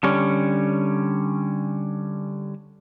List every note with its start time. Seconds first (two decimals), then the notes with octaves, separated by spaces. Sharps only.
0.03 D3 G3 C#4